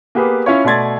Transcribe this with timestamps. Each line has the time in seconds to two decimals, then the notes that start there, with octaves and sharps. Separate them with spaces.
0.15 A#3 B3 G4 G#4 B4
0.46 C#4 E4 F4 C#5
0.64 B2 A3 D5 C6 G#6 A6